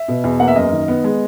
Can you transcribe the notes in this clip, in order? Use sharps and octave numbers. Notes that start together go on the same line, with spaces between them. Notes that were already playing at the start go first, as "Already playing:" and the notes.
Already playing: E5
B2
E2
A#3 F#5
E5
F#2 D#5
D#3
B3
G#3